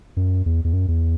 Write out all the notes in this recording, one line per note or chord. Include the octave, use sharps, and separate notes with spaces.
F#2
E2
E2
F#2
E2